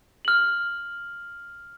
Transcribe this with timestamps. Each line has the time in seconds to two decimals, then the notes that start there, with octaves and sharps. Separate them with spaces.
0.25 F6 F#7